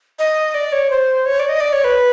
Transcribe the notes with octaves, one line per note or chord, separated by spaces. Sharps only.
D#5
D5
C#5
C5
C#5
D5
D#5
D5
C#5
B4